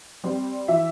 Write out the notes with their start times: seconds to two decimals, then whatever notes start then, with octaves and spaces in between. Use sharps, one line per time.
0.23 G3 C4
0.68 E3 E5